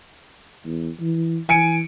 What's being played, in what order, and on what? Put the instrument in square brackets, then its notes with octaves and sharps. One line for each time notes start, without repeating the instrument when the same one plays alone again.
[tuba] E2
E3
[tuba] E3 [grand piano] G#5 C#7 D7